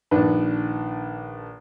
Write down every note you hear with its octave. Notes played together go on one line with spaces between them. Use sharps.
A#1 D#3 D4 B4